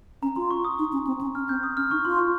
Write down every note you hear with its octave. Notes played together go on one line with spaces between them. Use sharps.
C#4 A#5
F4 C6
C#6
D#6
D#4
C#4
C4
C#4
C#4 F6
C4 G6
D#6
C#4 F6
D#4 C#6
F4 C6
C#6